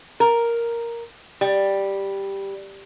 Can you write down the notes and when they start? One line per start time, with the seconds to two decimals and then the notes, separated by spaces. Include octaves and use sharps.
0.20 A#4
1.41 G3